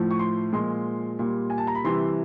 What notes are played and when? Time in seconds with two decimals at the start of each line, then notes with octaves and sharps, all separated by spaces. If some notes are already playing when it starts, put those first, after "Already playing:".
Already playing: A2 F3 A3
0.11 C#6
0.19 C6
0.52 A#2 F3 G#3 C6
1.19 A#2 G3
1.50 G#5
1.58 A5
1.67 A#5
1.75 B5
1.84 C3 E3 G3 C6